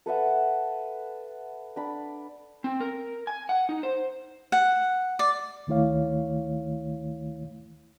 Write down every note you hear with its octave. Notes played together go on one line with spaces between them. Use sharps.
A4 B4 E5 F#5
D4 B5
C4
A#4
G#5
F#5
D#4
C5
F#5
D5
D2 D#3 A3 E4 C#5 F5